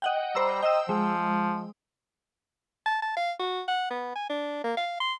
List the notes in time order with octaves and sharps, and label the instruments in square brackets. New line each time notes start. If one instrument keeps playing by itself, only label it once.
[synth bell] D#5 F#5 G5
[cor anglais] G3 [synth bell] C5 A#5 E6
[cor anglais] D#5 [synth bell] G5 E6
[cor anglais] F3 [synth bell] G#3
[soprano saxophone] A5
A5
F5
F#4
F#5
B3
G#5
D4
A#3
F5
C6